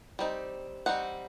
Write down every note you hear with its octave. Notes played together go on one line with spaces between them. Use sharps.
G3 C4 D#4
G3 C4 D#4 F#5